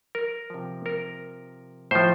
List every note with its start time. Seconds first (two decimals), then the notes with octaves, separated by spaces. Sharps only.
0.15 A#4
0.50 C3 F3
0.86 A#4
1.91 A2 F3 C5